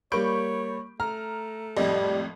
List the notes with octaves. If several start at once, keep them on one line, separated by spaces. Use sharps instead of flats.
G3 A#3 C#5 B5 C#6 G6 D7
A3 A#5 F6
G#1 F2 A2 G3 D#5